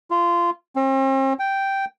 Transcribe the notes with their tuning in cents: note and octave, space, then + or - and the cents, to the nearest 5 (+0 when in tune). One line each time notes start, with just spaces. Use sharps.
F4 -20
C4 +40
G5 -5